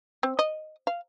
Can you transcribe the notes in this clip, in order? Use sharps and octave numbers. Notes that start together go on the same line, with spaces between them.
C4
D#5
F5